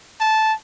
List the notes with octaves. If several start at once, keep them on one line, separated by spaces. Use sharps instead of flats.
A5